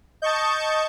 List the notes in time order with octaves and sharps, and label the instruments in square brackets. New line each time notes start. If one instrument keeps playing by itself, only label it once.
[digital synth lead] D#5 [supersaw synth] A5 C#6 G6